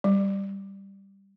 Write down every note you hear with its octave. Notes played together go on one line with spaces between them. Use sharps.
G3